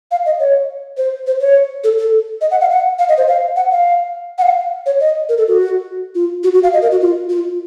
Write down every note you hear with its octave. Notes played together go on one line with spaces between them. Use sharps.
F5
D#5
C#5
C5
C5
C#5
A4
A4
D#5
F#5
F5
F#5
F5
D#5
C5
F5
F#5
F5
F#5
F5
C#5
D#5
A#4
A4
F#4
F4
F#4
F#4
F5
D#5
A#4
F#4
F4
F4